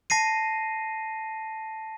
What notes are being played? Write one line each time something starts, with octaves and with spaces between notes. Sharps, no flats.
A5 A#6 C7 D#7